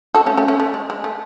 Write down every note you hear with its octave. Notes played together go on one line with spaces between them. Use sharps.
F#4 A4
A3 C#4
A3 C#4
A3 C#4
A3
G#3
G#3
A3